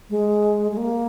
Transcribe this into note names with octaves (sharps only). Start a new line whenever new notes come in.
G#3
G#3
A#3